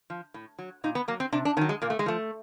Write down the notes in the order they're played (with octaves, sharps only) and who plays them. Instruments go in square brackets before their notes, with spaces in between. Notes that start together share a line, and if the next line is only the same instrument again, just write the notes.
[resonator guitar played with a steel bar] F3
A2
F#3
A#2 D#4
B3
F#3 A#3
C4
C3 D4
D4
D#3 C#4
F#3
G#3
A#2 A#3
A3
G#3
F3 A3